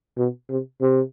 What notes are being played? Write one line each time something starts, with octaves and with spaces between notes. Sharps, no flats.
B2
C3
C3